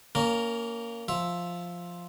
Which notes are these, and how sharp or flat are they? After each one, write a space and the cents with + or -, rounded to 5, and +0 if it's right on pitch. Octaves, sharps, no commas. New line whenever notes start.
A#3 -5 C#4 +25 A#4 -5
F3 +0 E5 +0